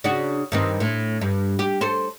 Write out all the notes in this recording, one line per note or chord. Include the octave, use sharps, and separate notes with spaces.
C#3 D4 F#4
G2 D#3 C4
A2
G2
G4
A4 C5